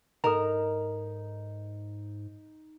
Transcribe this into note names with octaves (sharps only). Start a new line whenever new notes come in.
G#2 D#4 A4 A#4 A#5